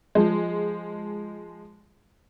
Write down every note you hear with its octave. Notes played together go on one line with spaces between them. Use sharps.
F3 G#3